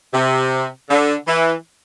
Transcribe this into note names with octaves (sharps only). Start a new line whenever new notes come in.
C3
D3
E3